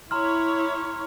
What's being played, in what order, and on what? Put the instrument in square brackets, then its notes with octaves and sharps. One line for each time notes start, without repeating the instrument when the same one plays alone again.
[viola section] E4 C#5 [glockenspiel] A#5 C6 F6